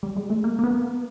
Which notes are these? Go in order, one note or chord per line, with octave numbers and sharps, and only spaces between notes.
G3
G#3
A3
A#3
A#3
B3